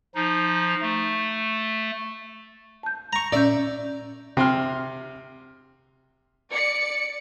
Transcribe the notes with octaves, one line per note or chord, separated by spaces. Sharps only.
F3 D#4
A3
A5 G6
A#5 C#6
A#2 C#4 D5 E5 G6
C3 C6 F6
D5 C#7